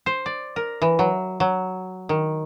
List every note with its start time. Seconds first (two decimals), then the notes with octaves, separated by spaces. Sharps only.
0.06 C5
0.26 D5
0.56 A#4
0.82 E3
0.99 F#3
1.40 F#3
2.09 D#3